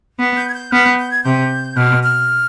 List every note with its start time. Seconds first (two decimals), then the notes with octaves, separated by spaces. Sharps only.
0.19 B3
0.37 G6
0.49 G#6
0.54 G6
0.71 B3 F6
0.85 G6
0.99 G6
1.11 G#6
1.24 C3 G6
1.77 B2 F6
2.03 F6